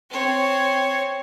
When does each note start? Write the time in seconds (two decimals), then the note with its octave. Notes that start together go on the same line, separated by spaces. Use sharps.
0.11 C4 C#5